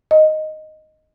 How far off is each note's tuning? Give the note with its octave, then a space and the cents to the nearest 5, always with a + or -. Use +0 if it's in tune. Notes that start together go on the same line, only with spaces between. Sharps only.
D#5 +0